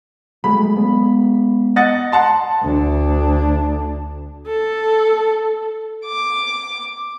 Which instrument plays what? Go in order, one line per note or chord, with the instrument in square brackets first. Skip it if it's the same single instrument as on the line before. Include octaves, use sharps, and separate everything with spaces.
[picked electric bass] F#3 G#3 A3 [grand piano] B5
[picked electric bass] G#3 B3
[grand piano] D#5 F#5 A6
F#5 A5 C6
[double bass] D2 D4
[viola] A4
[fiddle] D6